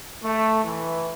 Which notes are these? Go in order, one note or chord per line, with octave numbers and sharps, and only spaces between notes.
A3
E3